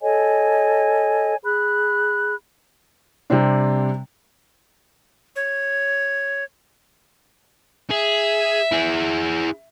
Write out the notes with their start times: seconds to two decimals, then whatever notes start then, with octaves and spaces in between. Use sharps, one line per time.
0.02 A4 C#5 D#5 G#5
1.44 G#4 B5 F#6
3.30 C3 G3 C4 D4
5.36 C#5
7.90 G#4 E5
8.72 E4 G#4